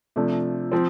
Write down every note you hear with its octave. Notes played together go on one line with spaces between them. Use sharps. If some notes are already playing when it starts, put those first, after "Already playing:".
C3 F3 A3 D4
F3 C4